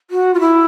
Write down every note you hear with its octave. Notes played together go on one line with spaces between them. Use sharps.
F#4
F4
E4